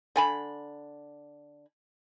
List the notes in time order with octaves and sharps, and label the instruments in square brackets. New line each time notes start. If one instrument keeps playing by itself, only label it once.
[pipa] D3 G#5 B5